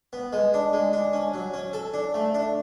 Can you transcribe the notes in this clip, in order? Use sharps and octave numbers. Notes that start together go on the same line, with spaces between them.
B3
G#3
D4
G#3
D4
C#4
F#3
C#4
A4
D4
A3
D4